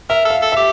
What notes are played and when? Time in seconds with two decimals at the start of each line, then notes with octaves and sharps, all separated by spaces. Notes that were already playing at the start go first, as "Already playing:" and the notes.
0.09 A#4 E5
0.25 A4
0.30 F5
0.42 A4
0.52 G4 E5